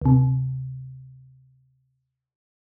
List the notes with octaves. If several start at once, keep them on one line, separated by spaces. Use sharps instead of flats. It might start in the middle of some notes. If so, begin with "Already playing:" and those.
D2 C3